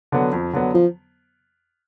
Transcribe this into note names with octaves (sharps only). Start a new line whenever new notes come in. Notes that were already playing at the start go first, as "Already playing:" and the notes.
D3 F#3 B3
F2
D3 F#3 B3
F3